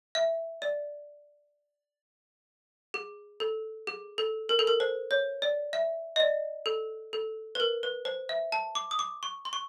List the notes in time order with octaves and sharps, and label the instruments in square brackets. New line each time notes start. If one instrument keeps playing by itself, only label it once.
[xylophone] E5
D5
G#4
A4
G#4
A4
A#4
A4
A#4
C5
C#5
D5
E5
D#5
D5
A4
A4
B4
A#4
B4
C5
E5
A5
D6
D#6
D6
C#6
C6
C#6